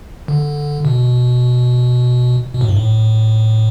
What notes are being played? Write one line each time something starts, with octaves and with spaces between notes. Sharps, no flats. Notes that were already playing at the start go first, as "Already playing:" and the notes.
D3
B2
B2
A2
G2
A2